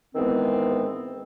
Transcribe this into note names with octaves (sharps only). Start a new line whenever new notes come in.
G#2 D#3 E3 G#3 B3 C4